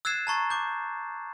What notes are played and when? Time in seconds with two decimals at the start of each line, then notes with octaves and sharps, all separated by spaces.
0.05 E6 F#6 G#6 A6 C7 E7
0.27 A5 A#5 C#6 A6
0.50 D6 G6